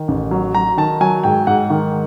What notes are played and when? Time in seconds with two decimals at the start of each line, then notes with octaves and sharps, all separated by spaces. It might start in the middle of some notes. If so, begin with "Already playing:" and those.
Already playing: D#3
0.08 A1
0.31 F#3
0.55 F#3 A#5
0.78 D#3 A5
1.01 F#3 G#5
1.23 G#2 G5
1.47 G#2 F#5
1.70 D#3